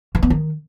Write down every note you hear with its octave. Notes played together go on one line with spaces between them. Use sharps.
E3
B3
D#3